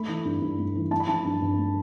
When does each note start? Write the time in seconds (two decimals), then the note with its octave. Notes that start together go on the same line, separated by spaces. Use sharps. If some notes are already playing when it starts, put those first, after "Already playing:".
Already playing: A3 B5
0.08 E3
0.25 G2
0.41 G2
0.58 A3
0.75 E3
0.91 A3 A5
1.00 B5
1.08 F3 A5
1.25 G2
1.42 G2
1.58 A3